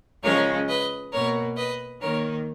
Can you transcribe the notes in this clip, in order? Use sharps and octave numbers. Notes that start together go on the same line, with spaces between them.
C#3 F3 G#3 A#4 C#5
B4 D#5
B2 A#3 A#4 C#5
B4 D#5
D#3 A#3 A#4 C#5